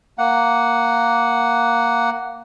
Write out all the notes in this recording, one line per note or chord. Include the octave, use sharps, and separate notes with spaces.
A#3 F#5